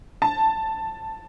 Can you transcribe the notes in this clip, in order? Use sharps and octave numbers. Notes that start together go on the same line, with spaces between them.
A5